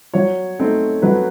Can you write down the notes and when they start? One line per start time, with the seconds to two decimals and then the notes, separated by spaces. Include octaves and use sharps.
0.14 F#3 C#5
0.59 A3 C4 D#4
1.02 F#3 B4